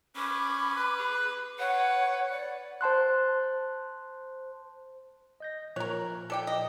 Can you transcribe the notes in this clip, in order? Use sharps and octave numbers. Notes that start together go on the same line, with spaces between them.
C#4 B5 D6
B4
G#4
B4 C#5 F#5
D5
C5 A5 C6 F#6
D#5 G6 A#6
A#2 F3 A#4 C#5 F#6
A4 D5 G5
D#5